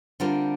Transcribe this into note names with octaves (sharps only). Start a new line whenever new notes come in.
D3 G3 C4 F4 A#4